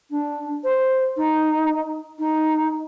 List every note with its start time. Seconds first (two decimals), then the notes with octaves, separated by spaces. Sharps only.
0.11 D4
0.64 C5
1.17 D#4
2.19 D#4